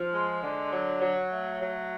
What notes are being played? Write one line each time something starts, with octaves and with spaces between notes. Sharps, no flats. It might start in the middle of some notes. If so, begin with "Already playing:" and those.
Already playing: F3
G#3
D3
F#3
F#3
A3
F#3